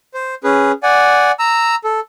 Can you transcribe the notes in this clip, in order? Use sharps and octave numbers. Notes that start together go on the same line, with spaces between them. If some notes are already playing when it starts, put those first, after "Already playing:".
C5
C#4 G#4 B4
D5 F#5 G#5
A#5 E6
A4